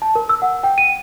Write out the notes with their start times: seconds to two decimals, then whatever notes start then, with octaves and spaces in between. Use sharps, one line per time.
0.02 A5
0.15 A#4
0.29 E6
0.42 F#5
0.63 G5
0.78 D#7